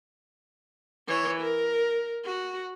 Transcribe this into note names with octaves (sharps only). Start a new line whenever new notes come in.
E3 C#5
A#4
F#4